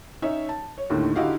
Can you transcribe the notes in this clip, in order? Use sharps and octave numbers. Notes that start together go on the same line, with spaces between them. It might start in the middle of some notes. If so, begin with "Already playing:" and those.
C#4 D#4 C#5 E5
A5
C#5
D#2 A2 D3 D#3
D3 D#4 E4 F#4 G4 F5